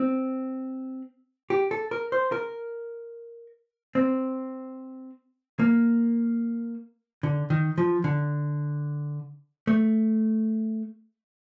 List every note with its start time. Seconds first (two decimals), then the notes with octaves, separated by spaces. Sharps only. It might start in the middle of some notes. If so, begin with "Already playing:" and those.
Already playing: C4
1.50 G4
1.71 A4
1.91 A#4
2.12 C5
2.32 A#4
3.95 C4
5.59 A#3
7.23 D3
7.50 D#3
7.78 F3
8.04 D3
9.67 A3